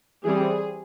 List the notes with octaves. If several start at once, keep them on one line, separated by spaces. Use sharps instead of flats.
E3 G3 C4 G#4